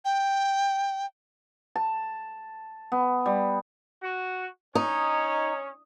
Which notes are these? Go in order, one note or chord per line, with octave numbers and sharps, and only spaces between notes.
G5
A5
B3
G3
F#4
C#4 D#4 C#5